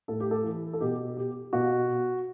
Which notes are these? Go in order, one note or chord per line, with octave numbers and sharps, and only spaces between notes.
A2 A4
G4
A4
E3
A4
B2 G4
G4
B2 F#4